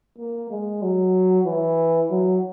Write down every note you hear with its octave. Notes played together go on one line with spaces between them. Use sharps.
A#3
G#3
F#3
E3
F#3